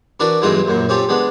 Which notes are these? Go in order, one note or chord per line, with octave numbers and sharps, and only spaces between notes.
E3 D4 F#4 A#4 B4 D5
B1 G2 E3 G#3 F4 D#5
A#1 F#2 A#2
C4 C#4 F4 G4 A4
G#3 B3 D4